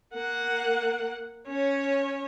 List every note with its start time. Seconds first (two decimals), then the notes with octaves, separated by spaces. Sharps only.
0.14 A#3 F#5
1.48 C#4 C#5